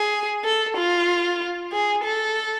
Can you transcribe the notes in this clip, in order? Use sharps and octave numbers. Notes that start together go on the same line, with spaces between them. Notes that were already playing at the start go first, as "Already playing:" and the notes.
Already playing: G#4
A4
F4
G#4
A4